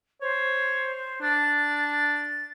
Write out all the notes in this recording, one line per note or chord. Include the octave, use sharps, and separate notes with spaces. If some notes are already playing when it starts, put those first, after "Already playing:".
C5 C#5
D4 A6